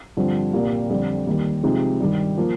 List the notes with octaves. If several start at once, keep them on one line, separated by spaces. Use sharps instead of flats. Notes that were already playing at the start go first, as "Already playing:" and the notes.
G2 D3 F3 C4
C2 A#2 G3 A#3
F2 D3 G3 D4
D#2 D#3 G3
C3 F3 G#3 D#4
G2 D#3 G3
F3 A#3